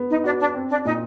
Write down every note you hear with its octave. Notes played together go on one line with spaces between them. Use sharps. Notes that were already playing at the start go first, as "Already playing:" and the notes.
Already playing: B3
D#4
D4 F#4
D4
C4
D4
A#2 D#4